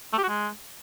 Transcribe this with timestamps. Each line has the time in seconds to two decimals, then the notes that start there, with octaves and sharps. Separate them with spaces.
0.13 A3
0.18 G4
0.24 F#4
0.29 G#3